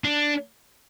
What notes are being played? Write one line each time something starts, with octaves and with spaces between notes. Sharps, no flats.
D4